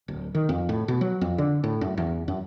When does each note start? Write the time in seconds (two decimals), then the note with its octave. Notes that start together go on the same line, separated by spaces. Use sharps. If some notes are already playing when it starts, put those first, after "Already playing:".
0.08 D1
0.35 D#3
0.49 F2
0.69 A2
0.88 B2
1.01 F#3
1.21 F2
1.38 D3
1.64 A2
1.81 F#2
1.98 E2
2.28 F#2